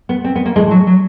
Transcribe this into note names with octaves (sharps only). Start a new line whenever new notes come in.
B3
C4
B3
A#3
A2 E3 G#3
F#3
F#3